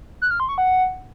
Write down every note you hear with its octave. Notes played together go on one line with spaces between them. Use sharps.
F#6
F6
C6
C#6
F#5